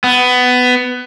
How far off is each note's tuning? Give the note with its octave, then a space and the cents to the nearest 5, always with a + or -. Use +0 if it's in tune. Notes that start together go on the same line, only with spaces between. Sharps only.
B3 +15